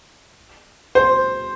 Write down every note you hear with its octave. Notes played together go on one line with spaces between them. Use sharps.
C5